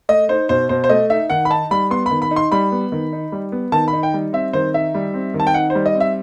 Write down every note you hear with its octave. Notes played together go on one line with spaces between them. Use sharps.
A3 D#5
D#4 C5
B2 C5
B2 C5
C5
A3 D#5
D#4 E5
D#3 F#5
B5
D#4 A5
G3 B5
B3 C6
D#3 B5
B5
D#4
C6
G3 B5
B3
D#3
D#4
G3
B3
D#3 A5
B5
D#4
G5
G3
C4 E5
D#3 C5
D#4 E5
G3
C4
D#3
A5
G5
D#4 F#5
C5
G3
D#5
C4
E5